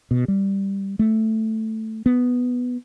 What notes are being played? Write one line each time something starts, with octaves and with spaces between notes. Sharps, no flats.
B2
G3
A3
B3